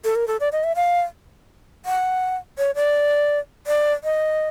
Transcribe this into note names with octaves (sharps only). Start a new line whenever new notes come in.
A4
A#4
A4
D5
D#5
E5
F5
F#5
C#5
D5
D5
D#5